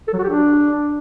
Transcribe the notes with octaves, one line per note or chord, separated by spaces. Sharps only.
A4
F#3
F#4
G4
D4